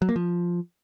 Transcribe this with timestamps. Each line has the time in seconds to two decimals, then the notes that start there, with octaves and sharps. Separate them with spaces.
0.02 F#3
0.09 A#3
0.16 F3